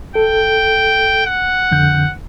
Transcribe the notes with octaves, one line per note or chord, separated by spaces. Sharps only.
A4 G5
F#5
F2 D3 G6